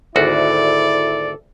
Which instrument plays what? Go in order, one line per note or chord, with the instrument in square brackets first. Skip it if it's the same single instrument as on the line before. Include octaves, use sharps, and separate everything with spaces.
[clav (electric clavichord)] G#1 D2 F#4 [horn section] E4 A4 D5